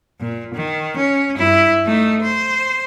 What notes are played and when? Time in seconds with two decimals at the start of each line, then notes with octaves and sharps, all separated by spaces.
0.20 A#2
0.54 D#3
0.97 C#4
1.37 G2 E4
1.86 A3 D#4
2.22 C5